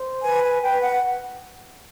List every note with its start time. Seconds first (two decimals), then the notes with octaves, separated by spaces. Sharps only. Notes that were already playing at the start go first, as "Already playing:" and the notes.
Already playing: C5
0.23 B4 G#5
0.43 G#5
0.62 B4 G5
0.82 F#5